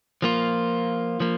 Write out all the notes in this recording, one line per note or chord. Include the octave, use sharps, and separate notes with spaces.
F3 A#3 F4
F3 A#3